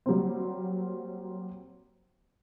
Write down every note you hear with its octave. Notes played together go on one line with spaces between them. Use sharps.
F#3 G3 A#3 C4